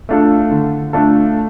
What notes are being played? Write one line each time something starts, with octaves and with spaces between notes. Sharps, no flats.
A3 D4 F4 A4
D3
A3 D4 F4 A4